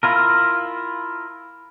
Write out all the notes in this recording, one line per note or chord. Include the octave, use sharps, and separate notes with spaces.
E4 F4 A#4